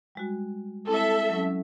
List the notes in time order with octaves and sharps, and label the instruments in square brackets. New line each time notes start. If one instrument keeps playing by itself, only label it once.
[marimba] G3 G#3 F#4
[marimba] G#3 C4 E4 [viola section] A4 E5
[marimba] F#3 C#4